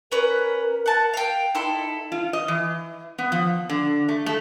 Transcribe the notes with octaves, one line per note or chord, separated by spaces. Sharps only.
C#4 A#4 B4
F#5 A5
F5 G5
D#4 E4 A4 C6
F4
D#5
E3
B3
F3
D3
A3
A3